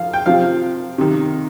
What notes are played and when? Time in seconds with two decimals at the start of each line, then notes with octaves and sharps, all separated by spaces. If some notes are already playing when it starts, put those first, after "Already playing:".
Already playing: F3 F5
0.13 G5
0.26 C3 F3 F5
0.98 C3 D#3